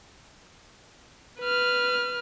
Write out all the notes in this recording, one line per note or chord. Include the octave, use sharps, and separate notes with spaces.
B4 F6